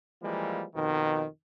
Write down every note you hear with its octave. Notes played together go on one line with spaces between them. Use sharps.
E3 F3 G3 G#3 A#3
F2 B2 D#3